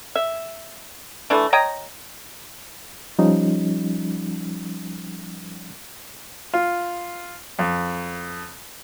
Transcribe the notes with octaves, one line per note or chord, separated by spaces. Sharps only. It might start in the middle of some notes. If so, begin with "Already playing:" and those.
E5
E3 A3 D4
C#5 D#5 G5 A#5
F3 G3 C#4 D#4
F4
F2